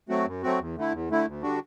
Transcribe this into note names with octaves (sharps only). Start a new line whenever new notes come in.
F#3 A3 C4 F#4
F#2
F#3 A3 C4 F#4
E2
D3 A3 E4
E2
D3 A3 E4
D2
D3 G3 D4 F#4